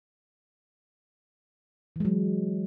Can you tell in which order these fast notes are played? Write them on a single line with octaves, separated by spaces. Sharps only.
E3 G#3 F#3